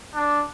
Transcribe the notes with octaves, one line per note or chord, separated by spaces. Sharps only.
D4